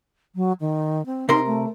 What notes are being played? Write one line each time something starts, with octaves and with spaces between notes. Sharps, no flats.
F#3
D#3
C4
C3 D#4 A#4 C6
A3